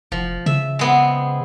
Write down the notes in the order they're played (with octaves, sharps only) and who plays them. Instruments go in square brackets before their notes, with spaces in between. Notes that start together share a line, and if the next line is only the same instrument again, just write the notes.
[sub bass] F1 [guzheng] F3
[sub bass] C#3 [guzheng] E5
[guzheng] G#3 B3 C4